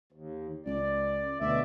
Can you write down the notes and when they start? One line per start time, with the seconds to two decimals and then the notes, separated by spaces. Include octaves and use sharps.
0.12 D#2
0.66 C#2 D5
1.40 D2 B2 D5 E5